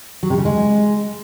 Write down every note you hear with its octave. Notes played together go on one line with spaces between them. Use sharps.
F#3
C3
C#3
G#3